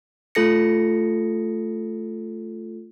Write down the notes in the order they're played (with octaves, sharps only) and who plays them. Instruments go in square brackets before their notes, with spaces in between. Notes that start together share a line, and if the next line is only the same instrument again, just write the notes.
[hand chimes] A3 F4 A4 A#6 C#7